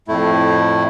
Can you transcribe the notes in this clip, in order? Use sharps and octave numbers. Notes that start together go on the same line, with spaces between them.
F2 A2 A3 E4